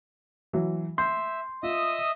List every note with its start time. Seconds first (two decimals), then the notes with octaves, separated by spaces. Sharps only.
0.53 E3 F#3
0.98 E5 C6 G6
1.63 F4 D#5 E5 D#6